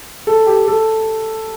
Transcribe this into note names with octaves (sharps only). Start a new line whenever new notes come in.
A4
G4
A4